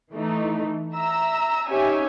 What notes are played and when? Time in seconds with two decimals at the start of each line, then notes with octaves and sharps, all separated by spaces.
0.13 E3 A3 D#4
0.94 E5 A#5 E6
1.70 C#4 D#4 G4 C#5 E5 G#5